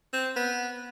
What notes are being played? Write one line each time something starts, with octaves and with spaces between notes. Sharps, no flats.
C4
B3